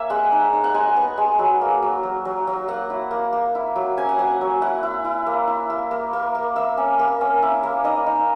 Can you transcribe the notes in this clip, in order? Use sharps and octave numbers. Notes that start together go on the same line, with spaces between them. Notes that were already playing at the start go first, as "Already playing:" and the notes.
Already playing: A#3 C#5 E5 G#5
G#3 F#5
D#4
D#4
F#5
G#3 G#5
B3
G#3
F#3
A#3
F#3
F#3
F#3
F#3
A#3 F#5
E4
A#3
A#3
E4
F#3
C#4 G#5
F#5
F#3 G#5
F#3
E4 F#5
E4
E4
A#3
E4
A#3
A#3
A#3
A#3
A#3 E5
C#4
A#3
C#4
E4
A#3
D#4 D#5
D#4